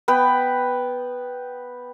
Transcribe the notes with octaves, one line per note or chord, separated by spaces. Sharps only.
B3 B4 G5